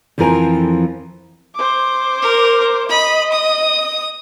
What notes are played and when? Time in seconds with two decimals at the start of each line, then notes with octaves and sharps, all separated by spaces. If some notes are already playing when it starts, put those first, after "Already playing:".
0.18 F2 E3 F3 C4 A#4 G#5
1.55 C5 D6
2.22 A#4
2.89 D#5 B5
3.32 D#6